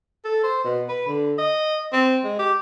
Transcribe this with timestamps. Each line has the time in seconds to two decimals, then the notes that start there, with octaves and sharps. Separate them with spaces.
0.24 A4
0.43 C5
0.64 B2
0.89 B4
1.07 D3
1.38 D#5
1.92 C4
2.24 G#3
2.39 G4